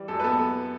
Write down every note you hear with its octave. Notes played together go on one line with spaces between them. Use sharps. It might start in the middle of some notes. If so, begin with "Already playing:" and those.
Already playing: E3 G3
F#2 A4
B4
B3 A4